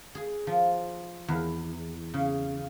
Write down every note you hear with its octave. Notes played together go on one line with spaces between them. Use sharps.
G#4
F3
E2
C#3